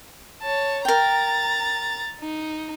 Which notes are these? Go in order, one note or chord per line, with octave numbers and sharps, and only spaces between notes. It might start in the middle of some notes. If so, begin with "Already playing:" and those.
C#5 A5
A#4 G5 A#5 A6
D#4